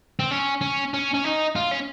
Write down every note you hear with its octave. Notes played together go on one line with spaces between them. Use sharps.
C4
C#4
C#4
C#4
C#4
D#4
F4
C#4